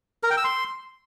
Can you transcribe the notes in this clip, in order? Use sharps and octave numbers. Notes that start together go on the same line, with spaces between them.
A#4
G5
E6
C6